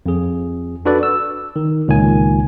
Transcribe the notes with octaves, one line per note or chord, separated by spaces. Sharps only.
F2 G#4
D4 F#4 A4 B4 D5
E6
D#3
C#2 A#2 D#3 G#5